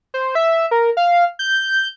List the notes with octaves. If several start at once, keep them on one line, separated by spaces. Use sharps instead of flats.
C5
E5
A#4
F5
G6